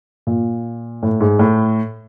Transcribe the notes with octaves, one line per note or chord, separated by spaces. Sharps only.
A#2
A2
G#2
A2